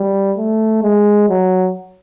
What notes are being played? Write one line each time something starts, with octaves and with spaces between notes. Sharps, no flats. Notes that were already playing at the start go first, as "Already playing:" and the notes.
Already playing: G3
A3
G#3
F#3